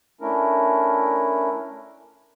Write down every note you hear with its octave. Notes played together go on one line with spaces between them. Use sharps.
A3 C#4 D4 E4 A#4